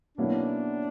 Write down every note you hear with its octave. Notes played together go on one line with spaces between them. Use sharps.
B2 F#3 A#3 C#4 D4 E4